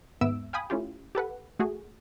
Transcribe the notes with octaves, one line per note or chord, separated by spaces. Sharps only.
D#2 G#2 B3 E5 E6 D7
F5 G5 G#5 B5 D#6
A3 C#4 E4 F4 G4
G4 A4 B4 F#5
A3 F#4 G#4